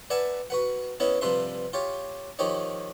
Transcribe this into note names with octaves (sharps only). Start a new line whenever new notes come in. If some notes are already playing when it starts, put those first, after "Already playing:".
B4 D5 E5 F#5 G#5 A5
F#4 B4 F#5
B3 C#4 E4 C#5 D#5 E5
G2 C3 F3 B4 E5 C6
F4 G4 C#5
D#3 F3 G4 C#5 D#5